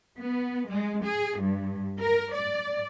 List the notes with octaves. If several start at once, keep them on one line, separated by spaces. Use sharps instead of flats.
B3
G#3
G#4
G2
A#4
D5